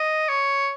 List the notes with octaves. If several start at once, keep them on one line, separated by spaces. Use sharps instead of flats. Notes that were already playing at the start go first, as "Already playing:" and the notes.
Already playing: D#5
C#5